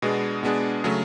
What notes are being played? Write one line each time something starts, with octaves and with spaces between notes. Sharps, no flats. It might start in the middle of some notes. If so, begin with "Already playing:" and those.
B2 G#3 B3 D4 G#4
B2 G#3 B3 D4 G#4
C#3 F#3 A3